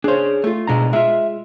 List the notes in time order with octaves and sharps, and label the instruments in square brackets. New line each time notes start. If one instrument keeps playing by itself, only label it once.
[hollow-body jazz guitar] D4 C5 [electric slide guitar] G#4 C#5
[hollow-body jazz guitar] A3 F4
[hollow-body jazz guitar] C2 G#3 [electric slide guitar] B2 D4 A#5
[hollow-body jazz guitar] G#3 F4 [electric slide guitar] E5